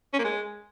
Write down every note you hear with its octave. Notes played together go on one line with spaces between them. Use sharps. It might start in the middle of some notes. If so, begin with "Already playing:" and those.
C#4
A#3
G#3